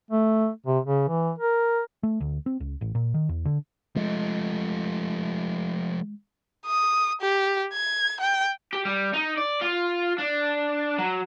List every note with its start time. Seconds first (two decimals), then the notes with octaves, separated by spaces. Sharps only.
0.11 A3
0.66 C3
0.85 C#3
1.08 E3
1.38 A#4
2.03 A3
2.20 D2
2.46 C4
2.60 C#2
2.81 A1
2.95 A#2
3.14 D#3
3.29 E2
3.45 D3
3.96 F3 G#3 A3
6.66 D#6
7.21 G4
7.73 G#6
8.20 G5
8.73 G4
8.85 G3
9.13 D#4
9.37 D5
9.61 F4
10.18 D4
10.99 F#3